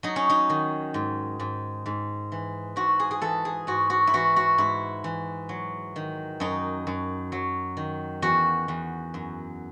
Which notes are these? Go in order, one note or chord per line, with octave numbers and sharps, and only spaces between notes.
F#3 D#4
C#4
D#4
D#3
G#2
G#2
G#2
E3
G#2 F#4
G#4
G#4
E3 A4
G#4
G#2 F#4
F#4
E4
E3 F#4
F#4
G#2 E4
E3
F#3
D#3
F#2 D#4
F#2
F#3
D#3
E2 F#4
E2
F#2